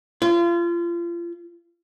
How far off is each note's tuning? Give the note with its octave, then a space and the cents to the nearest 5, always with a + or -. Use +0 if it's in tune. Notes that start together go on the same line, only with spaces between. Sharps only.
F4 -30